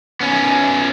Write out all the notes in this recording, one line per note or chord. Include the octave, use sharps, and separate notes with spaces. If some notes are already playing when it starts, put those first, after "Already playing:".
B3 C#4